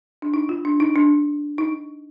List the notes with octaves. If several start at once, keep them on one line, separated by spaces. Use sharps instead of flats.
D4
D#4
F4
D4
D#4
D4
D#4